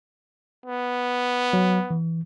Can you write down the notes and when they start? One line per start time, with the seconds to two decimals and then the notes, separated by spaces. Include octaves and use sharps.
0.66 B3
1.53 F#3
1.91 E3